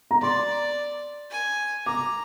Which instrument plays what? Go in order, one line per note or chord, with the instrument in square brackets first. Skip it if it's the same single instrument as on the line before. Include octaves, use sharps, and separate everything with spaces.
[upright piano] A#5
[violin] D5 [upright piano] C6
[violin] G#5
[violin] A#5 [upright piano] D6